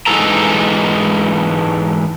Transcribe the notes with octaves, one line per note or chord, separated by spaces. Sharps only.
G#2 E3 G#3 D#4 A4 A#5